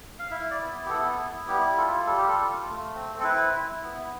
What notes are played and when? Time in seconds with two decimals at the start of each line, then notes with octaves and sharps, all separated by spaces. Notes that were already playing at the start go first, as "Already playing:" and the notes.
0.19 F5
0.31 E4 E5
0.51 D5
0.61 B3
0.85 G4
0.90 B3 A4
1.19 E4
1.48 G3 G4
1.77 F4 A4
2.07 G3 A4
2.18 G4
2.28 A4
2.36 F4
2.66 A3
2.94 C4
3.20 A4
3.24 E4 B4
3.53 E4
3.82 B3